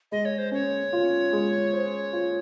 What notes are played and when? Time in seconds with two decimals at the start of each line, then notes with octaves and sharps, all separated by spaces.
0.12 G#3 D#5
0.25 C#5
0.38 C5
0.52 C#4 C#5
0.93 F4
1.33 G#3
1.73 C5
2.13 F4